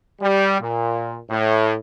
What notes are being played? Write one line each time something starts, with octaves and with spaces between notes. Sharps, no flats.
G3
A#2
A2